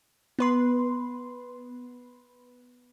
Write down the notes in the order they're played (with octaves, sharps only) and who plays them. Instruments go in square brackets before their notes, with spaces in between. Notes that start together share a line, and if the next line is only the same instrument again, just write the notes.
[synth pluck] B3 B4 C6